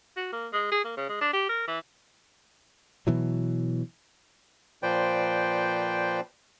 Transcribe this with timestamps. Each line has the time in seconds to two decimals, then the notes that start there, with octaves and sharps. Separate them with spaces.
0.16 F#4
0.33 A#3
0.53 G#3
0.72 G#4
0.84 A#3
0.97 C#3
1.09 G#3
1.21 D4
1.33 G4
1.49 A#4
1.68 E3
3.07 B2 E3 F#3
4.83 A#2 F3 B4 C5 D5 G5